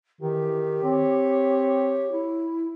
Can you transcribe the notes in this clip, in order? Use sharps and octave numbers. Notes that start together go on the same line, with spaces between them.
D#3 E3 G4
C4 C#5
E4